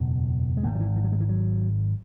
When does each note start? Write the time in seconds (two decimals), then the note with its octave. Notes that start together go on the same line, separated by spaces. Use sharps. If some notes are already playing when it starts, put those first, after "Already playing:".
Already playing: F#1 E2 B2
0.57 G#3
0.63 G#1 G#2 A#3
0.75 F#3
0.80 E3
0.96 E3
1.04 F#3
1.12 G#3
1.20 E3
1.29 F#3